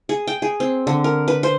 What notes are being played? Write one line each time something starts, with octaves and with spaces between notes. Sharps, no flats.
G#4
G5
G#4
C4
D3
A#4
B4
C5